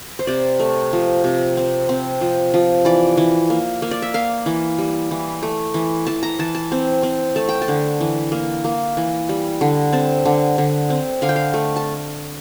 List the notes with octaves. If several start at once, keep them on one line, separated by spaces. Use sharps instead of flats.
C5
C3 D5
A3
F3
C3
C4
C4
F3
F3
E3 D5
E3
A#3
A#3
D5
E5
A#3 F5
E3
G3
E3
A3
E3
E3 A5
A#5
E3 A5
A5
C4
C4
A3 A5
G5
A5
D3
E3
A#3
A#3
E3
G3
D3
C4 A5
D3
D3
C4
D3 F5
G5
F5
A3
A5